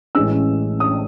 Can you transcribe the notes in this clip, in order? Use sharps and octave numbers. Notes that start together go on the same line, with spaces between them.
A1 A2 E3 G#3 C#4 E6
D#6